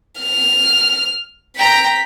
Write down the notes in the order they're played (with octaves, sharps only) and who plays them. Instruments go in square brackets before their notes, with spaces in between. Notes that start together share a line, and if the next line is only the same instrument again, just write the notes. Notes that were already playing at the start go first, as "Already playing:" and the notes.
[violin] F6
[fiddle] G5 A#5 [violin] B6